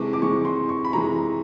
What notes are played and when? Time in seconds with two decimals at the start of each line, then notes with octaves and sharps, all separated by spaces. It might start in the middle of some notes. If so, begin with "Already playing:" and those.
Already playing: C3 E3 G#3 C#6 D6
0.13 D6
0.21 C3 E3 G#3 C#6
0.45 C6
0.69 C#6
0.84 B5
0.93 C3 E3 G#3 A#5